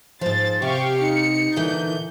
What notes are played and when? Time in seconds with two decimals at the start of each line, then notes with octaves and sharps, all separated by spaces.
0.21 G#2 F3 C5 A6
0.62 C3 G4 F5 C#6
1.00 D#4 C#7
1.56 A#2 D3 E3 G6